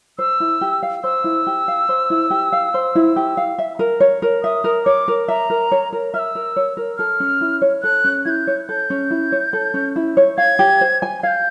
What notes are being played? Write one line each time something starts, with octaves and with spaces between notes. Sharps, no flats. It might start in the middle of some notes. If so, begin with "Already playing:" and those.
C5 E6
E4
G4
F5
C5 E6
E4
G4
F5
C5
E4
G4
F5
C5
E4
G4
F5
E5
A#4
C#5
A#4
E5 D#6
A#4
C#5 D6
A#4
E5 A#5
A#4
C#5
A#4
E5 F6
E6
A#4
C#5
A#4
A4 F6
C#4
E4
C#5
A4 F#6
C#4
E4 G6 G#6
C#5
A4 G6
C#4
E4
C#5
A4
C#4
E4
C#5
F5 G#6
G4
C5
G#5
F5 G6 G#6